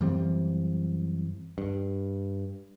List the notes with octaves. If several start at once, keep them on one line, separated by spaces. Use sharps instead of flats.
F#2 E3 G3 C4
G2